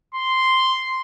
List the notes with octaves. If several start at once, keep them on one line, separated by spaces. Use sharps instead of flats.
C6